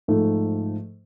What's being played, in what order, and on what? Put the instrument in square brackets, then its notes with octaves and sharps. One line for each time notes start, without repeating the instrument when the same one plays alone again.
[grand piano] G#2 F3 A3